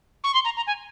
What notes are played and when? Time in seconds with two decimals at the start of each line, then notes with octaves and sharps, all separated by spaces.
0.24 C#6
0.34 C6
0.45 A#5
0.57 A#5
0.67 G#5